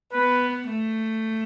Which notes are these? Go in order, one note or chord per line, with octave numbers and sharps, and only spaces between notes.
B3 B4
A3